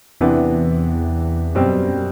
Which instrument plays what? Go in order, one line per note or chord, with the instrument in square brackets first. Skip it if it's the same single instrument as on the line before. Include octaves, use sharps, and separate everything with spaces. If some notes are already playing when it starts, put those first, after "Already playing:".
[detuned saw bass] E2 [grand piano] C3 E3 B3 D4
[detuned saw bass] F#2 [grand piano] B2 G3 C4